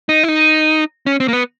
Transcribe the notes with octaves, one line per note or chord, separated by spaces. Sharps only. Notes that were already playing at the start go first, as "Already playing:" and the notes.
D#4
E4
D#4
C#4
C4
A#3
B3